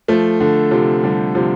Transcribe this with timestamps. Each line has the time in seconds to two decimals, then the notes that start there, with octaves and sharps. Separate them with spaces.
0.08 F3 A3
0.40 D3
0.71 C3 F3
1.03 D3 G3
1.35 C3 F3